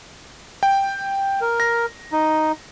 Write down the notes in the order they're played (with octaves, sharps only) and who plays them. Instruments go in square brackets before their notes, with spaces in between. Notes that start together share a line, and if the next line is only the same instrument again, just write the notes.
[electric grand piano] G5
[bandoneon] A#4
[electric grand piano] A#6
[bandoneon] D#4